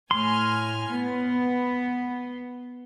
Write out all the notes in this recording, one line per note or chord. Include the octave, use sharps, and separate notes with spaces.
A2 G#5 C6 F6
B3